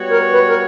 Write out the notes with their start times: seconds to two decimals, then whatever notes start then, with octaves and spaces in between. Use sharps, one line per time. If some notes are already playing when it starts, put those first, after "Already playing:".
Already playing: G3 B3 F#4 C#5
0.11 A#4
0.33 B4
0.48 A#4